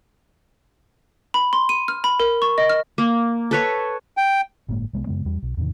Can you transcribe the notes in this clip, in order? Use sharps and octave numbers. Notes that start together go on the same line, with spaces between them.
B5
C6
D#7
F6
B5
A#4
C#6
D#5
F6
A#3
A4 B4 C#5
G5
G1 A2 G#3 A#3
C2 G#3 B3
F#2 C#3 G#3 B3
E2 G3
B1
E2 A2 C3 D#3